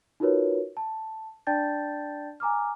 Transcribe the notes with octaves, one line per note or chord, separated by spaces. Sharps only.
D#4 F4 F#4 A#4 B4 C#5
A5
D4 D5 G5 A5 G6 A6
G#5 A#5 D6 F6